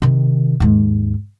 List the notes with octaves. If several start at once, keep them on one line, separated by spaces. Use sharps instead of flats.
C3 D#3
D#2 G#2